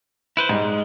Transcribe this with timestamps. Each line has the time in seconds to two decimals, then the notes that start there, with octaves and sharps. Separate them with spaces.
0.37 E4 B4 C5
0.49 G#2 G3
0.62 G#3